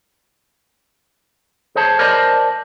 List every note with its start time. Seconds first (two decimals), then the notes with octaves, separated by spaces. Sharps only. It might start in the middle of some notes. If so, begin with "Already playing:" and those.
1.75 G#4 C5 C#5 A5
1.99 A#4 C5 D5 D#5 A5